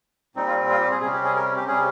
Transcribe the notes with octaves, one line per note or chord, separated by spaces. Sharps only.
A#2 G3 C4 D#4
F4
F4
G4
G#4
C3 G3 C#4 G#4
G4
G#4
A#4
G4
C3 G3 C#4 G#4